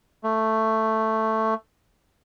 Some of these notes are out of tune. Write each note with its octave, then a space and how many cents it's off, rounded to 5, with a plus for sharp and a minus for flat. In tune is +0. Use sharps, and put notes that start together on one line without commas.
A3 +5